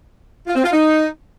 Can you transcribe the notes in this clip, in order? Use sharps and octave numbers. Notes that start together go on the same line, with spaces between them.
F4
C4
F4
D#4